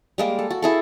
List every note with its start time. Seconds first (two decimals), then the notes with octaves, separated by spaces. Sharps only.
0.18 G3 G#3 A#3
0.39 A4
0.50 F#4
0.62 E4 G#4 A4